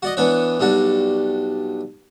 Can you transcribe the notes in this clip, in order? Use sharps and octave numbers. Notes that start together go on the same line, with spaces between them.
F#4 D5 D#5
E3 B3 D4 B4 C#5
B1 G3 D4 F#4